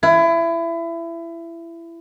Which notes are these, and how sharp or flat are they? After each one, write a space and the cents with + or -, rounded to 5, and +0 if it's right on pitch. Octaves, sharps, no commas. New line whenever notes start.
E4 +25